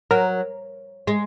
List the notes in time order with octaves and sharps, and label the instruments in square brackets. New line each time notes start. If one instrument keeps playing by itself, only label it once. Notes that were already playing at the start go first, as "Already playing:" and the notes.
[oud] F#3 [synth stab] A#4
[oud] G#3